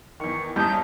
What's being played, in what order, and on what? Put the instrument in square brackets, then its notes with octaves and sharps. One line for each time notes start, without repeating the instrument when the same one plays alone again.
[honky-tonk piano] E2 D#3 [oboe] C#6
[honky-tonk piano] A1 E2 G3 [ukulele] C#4 D#5 A5 [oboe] D#4 [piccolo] G6